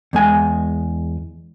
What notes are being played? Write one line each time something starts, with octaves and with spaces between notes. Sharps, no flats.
E2 G#3 G#5